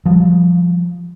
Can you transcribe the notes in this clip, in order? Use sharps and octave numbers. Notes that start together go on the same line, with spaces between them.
F3 G3